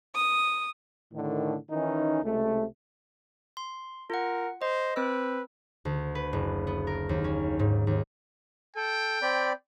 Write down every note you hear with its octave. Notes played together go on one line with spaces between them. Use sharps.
D#6
A2 D3 D#3
D#3 E3 C#4 D#4
C#2 C3 A3
C6
F4 A#4 F#5
C5 D#5
C4 B4 C5 E6
D2
B4
F#1
B3
A#4
D#2
C#4
G#2
D#2
A4 G5
C4 D5 B5